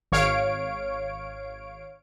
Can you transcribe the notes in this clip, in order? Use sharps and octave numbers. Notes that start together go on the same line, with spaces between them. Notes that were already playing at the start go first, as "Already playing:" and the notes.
G#1 C#5 F5 D7